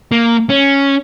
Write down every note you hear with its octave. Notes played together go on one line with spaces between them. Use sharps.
A#3
C#4